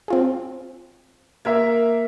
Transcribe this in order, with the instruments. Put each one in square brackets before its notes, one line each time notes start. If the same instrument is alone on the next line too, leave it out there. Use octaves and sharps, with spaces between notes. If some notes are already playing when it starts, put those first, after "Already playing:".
[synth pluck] C4 F4 G#4
[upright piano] A#3 A#4 E5 [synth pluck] G#6